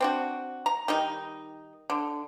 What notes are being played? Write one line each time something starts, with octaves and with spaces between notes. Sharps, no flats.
C4 D4 F#4
A#5
D#3 G3 D#4
D3